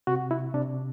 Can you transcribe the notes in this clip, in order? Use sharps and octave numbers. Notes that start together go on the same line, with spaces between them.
C3 F#4
E4
C3 D4